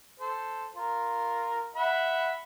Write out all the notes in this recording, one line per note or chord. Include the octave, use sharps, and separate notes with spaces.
A4 C5
F4 A#4
E5 F#5 B5